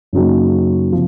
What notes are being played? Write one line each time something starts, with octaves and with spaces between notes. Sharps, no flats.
F#2 C#3 F#3 A#3 D#4
C3 F3